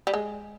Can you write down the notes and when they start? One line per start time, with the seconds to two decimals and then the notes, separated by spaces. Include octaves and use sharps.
0.07 G3
0.14 G#3